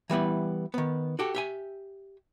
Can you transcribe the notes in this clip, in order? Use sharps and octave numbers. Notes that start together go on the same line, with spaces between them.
E3 G3 B3 E4
D#3 B3
F#4 G4 A4
G4 E5 G#5